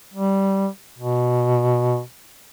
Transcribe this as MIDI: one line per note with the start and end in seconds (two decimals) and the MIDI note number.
0.14 0.68 55
0.98 2.01 47